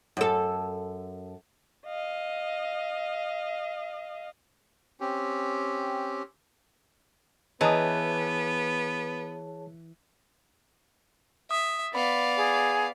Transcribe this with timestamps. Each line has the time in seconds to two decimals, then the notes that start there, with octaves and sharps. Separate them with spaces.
0.17 F#2 A4
1.86 D#5 F5
5.00 C4 C#4 G4
7.61 E3 B3 G#4 C#5 D#5 A5 A#5 D#6
11.51 E5 D#6
11.95 B3 D5 F5 B5
12.36 G#4